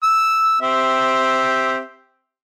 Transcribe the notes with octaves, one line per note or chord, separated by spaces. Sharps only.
E6
C4 G4 E5